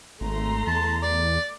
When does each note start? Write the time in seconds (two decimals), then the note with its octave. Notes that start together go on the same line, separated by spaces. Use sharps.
0.21 G#1 A3 A#5 C6
0.67 E2 A5
1.02 D5